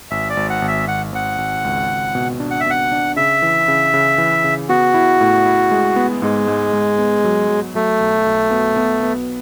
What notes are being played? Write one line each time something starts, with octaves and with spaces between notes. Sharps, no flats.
G#1 E5
D5
G#1
F#5
G#1
E5
G#1 F#5
G#1 F#5
G#1
C#2
C#2
B2
D4
F#5
E5
B2 F#5
D4
C#3 E5
E3
C#3
C#3
E3
C#3
B3 F#4
E4
A2
E4
G#3
B3
G#2 G#3
G#2
G#2
B3
F#3
F#3
F#3 A3
B1
B1
B3
B3
B3